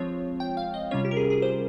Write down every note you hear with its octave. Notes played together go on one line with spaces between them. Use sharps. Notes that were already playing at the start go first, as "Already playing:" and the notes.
Already playing: F3 G#3 C4 F4 C#5
G5
F5
D#5
C3 G3 C#4 F4 C#5
G4
A#4
G#4
G#4
C5